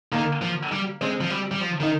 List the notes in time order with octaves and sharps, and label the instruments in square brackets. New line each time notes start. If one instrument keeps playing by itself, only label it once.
[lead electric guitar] D#3 [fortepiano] A#3
[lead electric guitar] F3
G3
[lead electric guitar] G#3 [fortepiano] C4
[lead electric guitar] F3
G3
G3
F3
[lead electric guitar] D#3 [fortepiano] D#4